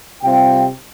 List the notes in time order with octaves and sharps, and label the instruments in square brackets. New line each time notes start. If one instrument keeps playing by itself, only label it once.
[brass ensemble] C3 G3 C4 F4 G5